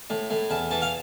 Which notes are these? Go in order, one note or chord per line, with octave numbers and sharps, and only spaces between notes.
A2
A2
E2 A5
E3 A5
F5